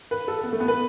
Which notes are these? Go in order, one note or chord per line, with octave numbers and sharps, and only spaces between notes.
B4
A4
B3
A3
B3
B4